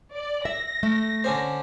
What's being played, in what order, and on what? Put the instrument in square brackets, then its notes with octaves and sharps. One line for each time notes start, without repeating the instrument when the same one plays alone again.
[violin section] D5
[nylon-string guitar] E5 [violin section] A#6
[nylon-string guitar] A3
[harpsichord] D3 C#4 C5